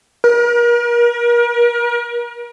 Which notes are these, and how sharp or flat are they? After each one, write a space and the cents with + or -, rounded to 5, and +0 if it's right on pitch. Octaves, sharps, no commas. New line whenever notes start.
A#4 +40